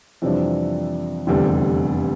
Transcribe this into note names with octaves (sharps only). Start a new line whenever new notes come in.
F2 C3 E3 G3 D4
F1 E2 D3 G3 C4